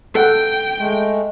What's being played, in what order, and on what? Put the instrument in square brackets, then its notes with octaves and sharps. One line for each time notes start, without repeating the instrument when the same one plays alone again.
[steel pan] A4 F#5 [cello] G5
[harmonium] G#3 A3